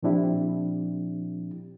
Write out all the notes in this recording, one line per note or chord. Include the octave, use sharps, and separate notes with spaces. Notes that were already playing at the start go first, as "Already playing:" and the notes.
A#2 F3 C4 D4 E4 G4